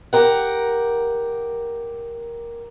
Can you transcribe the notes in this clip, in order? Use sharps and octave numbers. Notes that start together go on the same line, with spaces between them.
G4 A#4 F#5